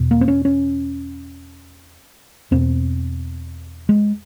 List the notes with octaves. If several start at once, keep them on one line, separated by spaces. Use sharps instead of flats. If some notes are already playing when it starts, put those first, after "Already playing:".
Already playing: E2 B2
A#3
C4
C#4
C#4
E2 B2 C4
G#3